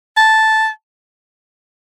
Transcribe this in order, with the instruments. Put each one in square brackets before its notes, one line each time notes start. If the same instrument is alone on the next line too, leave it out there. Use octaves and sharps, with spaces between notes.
[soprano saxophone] A5